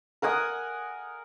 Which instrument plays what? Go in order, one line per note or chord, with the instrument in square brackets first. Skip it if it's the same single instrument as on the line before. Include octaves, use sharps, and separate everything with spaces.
[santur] A#4 F#5 G#5 D#6